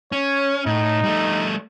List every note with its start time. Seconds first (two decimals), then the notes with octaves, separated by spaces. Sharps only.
0.12 C#4 C#5
0.66 A2 D#4
1.04 G3 A3